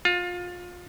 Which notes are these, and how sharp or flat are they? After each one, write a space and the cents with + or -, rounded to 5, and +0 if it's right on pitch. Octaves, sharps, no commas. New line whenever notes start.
F4 +25